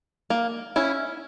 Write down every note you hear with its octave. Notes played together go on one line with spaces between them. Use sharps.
A#3
C#4 E4